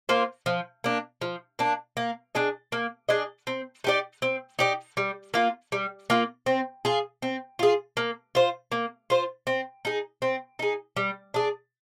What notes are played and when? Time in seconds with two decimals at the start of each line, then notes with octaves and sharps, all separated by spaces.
0.09 A#3 F4 C5
0.46 F3
0.84 A#3 D4
1.21 F3
1.59 A#3 D4
1.97 A#3
2.35 D4 G#4 D#5
2.72 A#3
3.09 D4 G#4 D#5
3.47 C4
3.84 D#4 G4 D5
4.22 C4
4.59 D#4 G4 D5
4.97 G3
5.34 A#3 F4
5.72 G3
6.10 A#3 F4
6.46 C4
6.85 F4 G#4
7.22 C4
7.59 F4 G#4
7.97 A#3
8.35 F4 C5
8.72 A#3
9.10 F4 C5
9.47 C4
9.85 D#4 G#4
10.22 C4
10.59 D#4 G#4
10.96 G3
11.34 D4 G#4